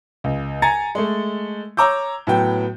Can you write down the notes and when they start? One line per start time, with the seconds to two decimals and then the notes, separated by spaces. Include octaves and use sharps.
0.24 C#2
0.62 G#5 A#5 G#6 A6 C#7
0.95 G#3 A3
1.77 C#5 A#5 D6 E6 G6
2.27 A2 F#3 B3 G5